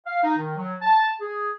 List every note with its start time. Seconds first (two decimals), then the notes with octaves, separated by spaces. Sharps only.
0.06 F5
0.22 D#4
0.37 D#3
0.56 F#3
0.80 A5
1.20 G#4